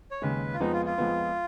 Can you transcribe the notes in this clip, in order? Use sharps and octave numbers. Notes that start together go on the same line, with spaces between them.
C#5
D#2 C#3 G#3 B4
F4
F2 F3 G#3 B3 D#4
F4
F4
F2 F3 G#3 B3